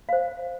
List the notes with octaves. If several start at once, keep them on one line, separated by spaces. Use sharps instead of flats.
C5 F5